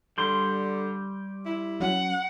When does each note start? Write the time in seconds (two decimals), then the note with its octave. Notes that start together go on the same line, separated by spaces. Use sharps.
0.18 D3 G3 C6 G6
1.45 E4
1.80 F#3 C#4 F#5